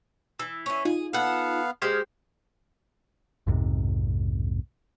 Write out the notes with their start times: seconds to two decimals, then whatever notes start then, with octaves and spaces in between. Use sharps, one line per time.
0.39 E3 E6
0.66 E3 C#4
0.85 D#4 F4 G#4
1.13 B3 A4 F5 F#5
1.82 G#3 G4 C5 D#6 F6 G#6
3.47 B1 F2 G#2 C3